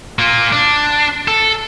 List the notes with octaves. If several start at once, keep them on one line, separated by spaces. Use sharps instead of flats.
A#3 F4
D4
A4